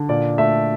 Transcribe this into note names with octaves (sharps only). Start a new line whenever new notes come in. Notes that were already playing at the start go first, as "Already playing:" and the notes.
Already playing: D3
A#2 D5
A3 E5